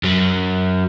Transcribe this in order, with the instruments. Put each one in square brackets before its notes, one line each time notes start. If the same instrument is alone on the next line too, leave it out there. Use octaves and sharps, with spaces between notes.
[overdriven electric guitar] F#2 F#3